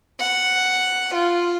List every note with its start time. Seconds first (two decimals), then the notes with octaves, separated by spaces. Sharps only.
0.20 F#5
1.14 F4